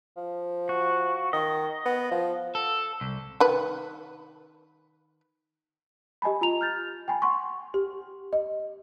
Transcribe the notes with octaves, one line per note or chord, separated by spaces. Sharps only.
F3
F#4
D#3 D#5
B3
F3
A4
C2
D#3 B4
G4 D#5 G#5 A5 B5
F4 A#5 F7
F6 G6 A6
G5 G#5 B5
F#5 C6 C#6
G4
D#5